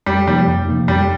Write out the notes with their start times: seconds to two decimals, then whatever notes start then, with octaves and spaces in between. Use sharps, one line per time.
0.06 F2 G3
0.27 C3 F3 G3 A#3 D#4
0.48 F2
0.68 C3 F3 A#3 D#4
0.88 F2 G3